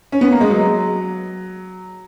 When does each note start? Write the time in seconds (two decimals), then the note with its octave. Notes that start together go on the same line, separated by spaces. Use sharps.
0.12 C#4
0.21 B3
0.31 A#3
0.41 G#3
0.50 F#3